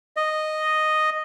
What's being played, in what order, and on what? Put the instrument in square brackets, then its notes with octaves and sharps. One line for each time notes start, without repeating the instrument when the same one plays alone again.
[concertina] D#5